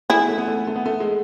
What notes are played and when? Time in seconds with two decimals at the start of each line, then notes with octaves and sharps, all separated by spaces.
0.10 A3 E4 G#4
0.19 B3
0.29 A3
0.38 B3
0.48 A3
0.57 B3
0.67 A3
0.76 B3
0.86 A3
1.00 G#3